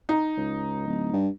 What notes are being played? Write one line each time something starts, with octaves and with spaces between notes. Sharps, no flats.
D#4
C#2
D1
G2